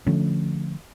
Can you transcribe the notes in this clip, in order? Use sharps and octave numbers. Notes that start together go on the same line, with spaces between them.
D3 F3 A3 C#4